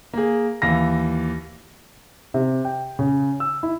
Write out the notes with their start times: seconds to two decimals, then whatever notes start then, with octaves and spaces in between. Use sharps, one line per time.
0.13 A#3 G#4
0.62 D#2 E3 F5 A#6
2.34 C3
2.65 G5
2.99 C#3
3.40 E6
3.63 E4